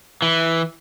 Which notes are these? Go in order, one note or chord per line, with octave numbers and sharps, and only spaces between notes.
E3